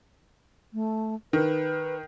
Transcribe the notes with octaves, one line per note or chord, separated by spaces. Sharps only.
A3
D#3 B4